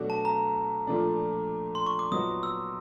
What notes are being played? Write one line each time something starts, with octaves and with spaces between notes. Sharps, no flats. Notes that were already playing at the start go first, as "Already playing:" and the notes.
Already playing: B2 F#3 A3 D4 F#4
A5
A#5
A#2 F3 A3 D4
C6
C#6
D6
A#2 F#3 B3 D#4 F#4 D#6
E6